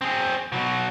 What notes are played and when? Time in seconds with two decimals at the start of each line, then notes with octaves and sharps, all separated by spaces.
0.01 C4 G#4
0.52 B2 F#3